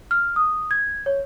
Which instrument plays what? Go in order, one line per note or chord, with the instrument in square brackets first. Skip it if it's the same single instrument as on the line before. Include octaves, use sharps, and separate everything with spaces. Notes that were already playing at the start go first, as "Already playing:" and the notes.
[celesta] F6
D#6
G#6
C#5